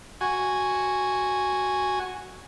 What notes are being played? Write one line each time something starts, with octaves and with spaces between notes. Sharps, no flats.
F#4 G#5